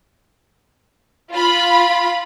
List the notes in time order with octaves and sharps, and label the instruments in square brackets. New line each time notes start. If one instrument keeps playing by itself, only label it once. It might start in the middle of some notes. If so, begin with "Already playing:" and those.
[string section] F4 B5